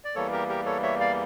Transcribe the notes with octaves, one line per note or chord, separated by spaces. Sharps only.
D5
E2 E3 G3 A#3 A4 C#5
G4 A#4
G4 A#4
A4 C#5
C#5 E5
D5 F5